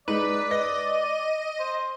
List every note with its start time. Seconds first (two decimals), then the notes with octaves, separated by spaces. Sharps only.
0.08 G#3 D#4 B4 D5
0.51 D#5 A#6
1.60 C5